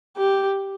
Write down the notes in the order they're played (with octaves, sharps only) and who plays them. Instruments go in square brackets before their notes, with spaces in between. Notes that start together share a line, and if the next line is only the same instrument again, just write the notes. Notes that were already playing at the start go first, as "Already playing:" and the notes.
[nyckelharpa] G4